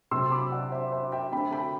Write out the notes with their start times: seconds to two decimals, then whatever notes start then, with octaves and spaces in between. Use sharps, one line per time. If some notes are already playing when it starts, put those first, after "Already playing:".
0.11 C3 F#3 C4 C6 E6
0.31 B5 D6
0.52 D5 F#5
0.72 C5 E5
0.92 C5 E5
1.12 E5 G5
1.32 D3 A3 C4 G5 B5
1.53 G5 B5